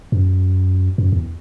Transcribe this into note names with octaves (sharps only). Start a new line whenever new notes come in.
F#2
F#2
E2